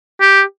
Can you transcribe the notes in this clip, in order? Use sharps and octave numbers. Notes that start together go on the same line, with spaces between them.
G4